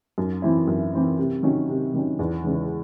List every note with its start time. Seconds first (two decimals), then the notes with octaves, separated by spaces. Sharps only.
0.18 F#2
0.42 E3 C4 E4
0.67 F#2
0.93 E3 C4 E4
1.19 C3
1.43 D#3 F#3 C#4
1.69 C3
1.94 D#3 F#3 C#4
2.19 E2
2.44 C#3 E3 G#3 C#4